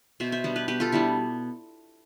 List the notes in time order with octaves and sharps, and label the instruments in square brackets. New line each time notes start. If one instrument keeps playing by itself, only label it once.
[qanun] B2 C5 E5
C5 E5
G3 B3 D4
G4 B4
B2 G4 B4
F4 A4
G3 B3 D4 E4